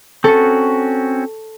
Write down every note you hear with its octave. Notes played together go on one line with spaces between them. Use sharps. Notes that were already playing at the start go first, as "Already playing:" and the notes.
C4 C#4 F#4 A4 C#6